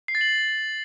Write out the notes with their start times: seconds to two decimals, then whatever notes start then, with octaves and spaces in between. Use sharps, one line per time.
0.08 C7
0.15 A6
0.21 F#7